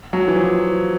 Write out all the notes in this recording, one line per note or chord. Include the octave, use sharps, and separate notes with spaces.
F#3
E3
F3